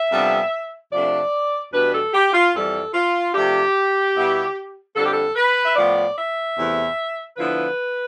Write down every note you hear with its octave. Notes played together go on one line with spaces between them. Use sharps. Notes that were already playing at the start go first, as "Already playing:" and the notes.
Already playing: E5
F2 C3 G3 B3 D4
C3 F3 A3 D4 D5
E2 B2 G3 D4 B4
A4
G4
F4
F2 E3 G3 A4
F4
C3 F3 A3 D4 G4
B2 G3 B3 E4
F2 D3 G3 A4
G4
A4
B4
E5
A2 F3 B3 D5
E5
E2 C3 E3 A3
D3 F3 B3 E4 B4